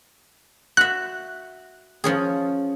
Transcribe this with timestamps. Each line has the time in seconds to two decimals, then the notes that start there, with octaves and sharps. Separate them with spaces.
0.77 F#4 E5 F#6
2.04 F3 C#4 G#4